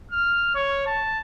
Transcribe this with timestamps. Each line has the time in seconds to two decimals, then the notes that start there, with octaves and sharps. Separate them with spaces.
0.12 F6
0.55 C#5
0.86 A5